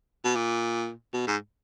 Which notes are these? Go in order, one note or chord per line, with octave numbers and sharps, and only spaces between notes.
B2
A#2
B2
G#2